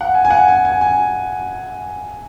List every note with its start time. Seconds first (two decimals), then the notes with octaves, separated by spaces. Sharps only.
0.01 F#5
0.14 G#5
0.25 G#5
0.30 F#5
0.48 G#5
0.65 G#5
0.81 G#5